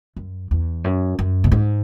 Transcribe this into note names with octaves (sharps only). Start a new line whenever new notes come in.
F#2
E2
F#2
F#2
B2
G#2